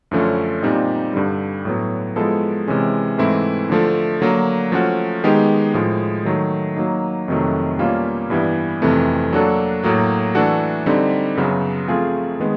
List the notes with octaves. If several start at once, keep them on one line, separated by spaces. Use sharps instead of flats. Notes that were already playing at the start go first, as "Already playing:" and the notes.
F#2 D3 F3 A3 C#4
A#2 G3 C4 D#4 G4
G2 D3 G3
A2 F#3 B3
F3 G#3 B3 E4 A4
C3 E3 G#3 C#4
G#2 E3 A3 C4 E4
D3 F3 A3
D3 F#3 A#3
F3 A3 C#4 F#4
D#3 G#3 B3 D#4 G4
A2 F3 G#3
D#3 F#3 A3
F#3 A#3 D#4
F2 C3 D#3 F#3 A3
B2 G3 A#3 C#4 F4
G2 E3 G3 B3 E4
F2 C3 E3 A3 C4
F#3 A#3 D4 F#4 A4
A2 F#3 A#3
E3 A3 D4 F#4 A4
D3 G3 C4 D#4
F#2 C#3 F#3 B3
F3 A3 C4 F4 G#4
D#3 G#3 B3